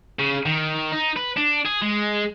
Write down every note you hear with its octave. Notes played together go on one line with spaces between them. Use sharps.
C#3
D#3
D#4
B4
D4
G#4
G#3